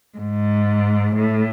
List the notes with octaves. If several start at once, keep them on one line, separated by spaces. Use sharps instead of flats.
G#2
A2